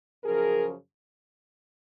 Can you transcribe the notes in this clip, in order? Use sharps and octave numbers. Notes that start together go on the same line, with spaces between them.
F#2 C#3 F3 G#4 A#4